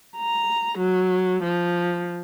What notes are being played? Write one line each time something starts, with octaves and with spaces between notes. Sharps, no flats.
A#5
F#3
F3